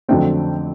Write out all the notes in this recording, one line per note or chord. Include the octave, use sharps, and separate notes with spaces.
F2 D3 F#3 A3 C4 G5